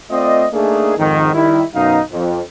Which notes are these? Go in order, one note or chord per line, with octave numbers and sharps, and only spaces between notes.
A3 C4 F4 D5 D#5
A3 A#3 D4 D#4 G#4
F2 G#2 D#3
D#3 G3 E4
F#2 B2 D#4 F5
F2